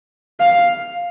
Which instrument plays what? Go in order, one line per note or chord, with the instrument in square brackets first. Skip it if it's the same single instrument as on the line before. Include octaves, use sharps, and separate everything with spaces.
[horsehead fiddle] F5